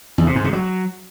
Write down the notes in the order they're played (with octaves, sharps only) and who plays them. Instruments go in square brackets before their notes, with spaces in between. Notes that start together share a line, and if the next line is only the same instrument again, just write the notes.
[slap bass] E2
C3
G#2
C3
F#3